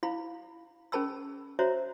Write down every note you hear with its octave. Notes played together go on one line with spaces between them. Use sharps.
E4 F5 B5
C#4 G#4 A#4 A5 B5 E6
F#4 C5 C#5 E5 A#5